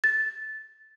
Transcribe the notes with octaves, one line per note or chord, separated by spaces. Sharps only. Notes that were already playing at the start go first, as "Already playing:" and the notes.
A6